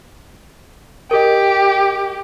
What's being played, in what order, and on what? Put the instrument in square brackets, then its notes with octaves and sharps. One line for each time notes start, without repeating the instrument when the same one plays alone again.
[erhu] G4 [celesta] A#4 D#5